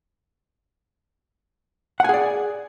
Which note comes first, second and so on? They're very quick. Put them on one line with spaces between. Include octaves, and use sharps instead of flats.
F#5 G#5 G#4 D5